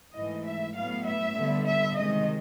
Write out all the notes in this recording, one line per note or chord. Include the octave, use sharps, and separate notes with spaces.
G#2 E3 A3 D#5
E5
A2 F#3 B3 F5
E5
D3 G3 B3
E5
C3 D#3 G#3 D#5